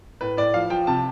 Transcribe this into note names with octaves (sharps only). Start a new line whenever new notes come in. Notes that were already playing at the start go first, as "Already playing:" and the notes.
A2 B4
A2 D5
F3 F5
F3 G5
C3 A5